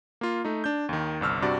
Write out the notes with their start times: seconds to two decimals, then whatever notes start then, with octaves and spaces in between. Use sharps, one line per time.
0.21 A#3 F4
0.45 A3 D#4
0.64 D4 G6
0.89 D#2 D#3
1.21 G1 C2 E6 F6
1.42 G2 C3 F#4 D5